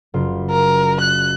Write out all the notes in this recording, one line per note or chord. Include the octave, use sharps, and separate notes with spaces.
F#1 F4
A#4
F#6